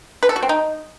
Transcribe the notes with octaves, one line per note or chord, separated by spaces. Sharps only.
B4
A4
F#4
C4
D#4